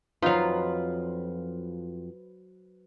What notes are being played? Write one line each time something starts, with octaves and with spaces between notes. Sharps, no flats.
F2 F3 F#3 D#4 F4 B4 C5 F5